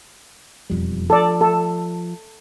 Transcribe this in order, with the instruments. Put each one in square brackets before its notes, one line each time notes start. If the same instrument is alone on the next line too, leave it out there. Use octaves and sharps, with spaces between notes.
[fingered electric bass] E1 F2 G3
[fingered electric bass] F3 [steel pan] A4 D5
[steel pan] A4